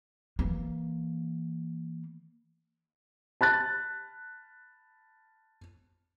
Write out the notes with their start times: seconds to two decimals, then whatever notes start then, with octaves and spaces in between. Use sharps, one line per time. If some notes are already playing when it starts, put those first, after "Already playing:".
0.39 E3 A#3
3.41 A5 B5 F#6 A6